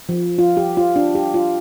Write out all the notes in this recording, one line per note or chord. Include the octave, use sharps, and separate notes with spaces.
F3
F4
G4
F4
D4
G4
F4